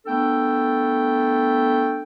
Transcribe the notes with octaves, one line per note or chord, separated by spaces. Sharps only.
A3 B3 D4 A4 G5